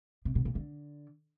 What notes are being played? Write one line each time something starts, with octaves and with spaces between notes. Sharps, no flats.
C3
B2
A#2
D3